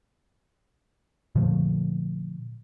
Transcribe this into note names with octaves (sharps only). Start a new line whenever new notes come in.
A#2 D3 F3 A3